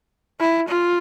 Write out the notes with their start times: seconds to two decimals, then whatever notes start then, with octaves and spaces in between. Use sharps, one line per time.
0.40 E4
0.69 F4